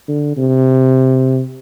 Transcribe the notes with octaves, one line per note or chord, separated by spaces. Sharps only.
D3
C3